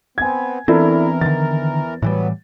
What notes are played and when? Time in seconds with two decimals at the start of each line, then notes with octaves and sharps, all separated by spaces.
0.18 B3 C4 G#5 G#6
0.68 E2 E3 C4 D4 E4 A4 A#4
1.21 D3 D#3 A6
2.02 A2 E3 F#3 G3 B3